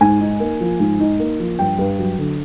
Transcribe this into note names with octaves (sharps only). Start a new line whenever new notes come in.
G#2 G#5
D#4
A#3
F3
G#2
D#4
A#3
F3
G2 G5
G2
F#3
D3